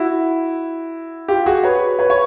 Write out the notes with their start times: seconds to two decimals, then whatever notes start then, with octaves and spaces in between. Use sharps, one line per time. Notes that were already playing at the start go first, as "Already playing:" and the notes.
Already playing: E4 F#4
1.28 F4 G4
1.46 F#4 G#4
1.63 B4 C#5
1.99 B4 C#5
2.10 C#5